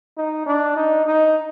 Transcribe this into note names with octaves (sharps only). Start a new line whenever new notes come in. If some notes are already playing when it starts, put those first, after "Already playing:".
D#4
D4
D#4
D#4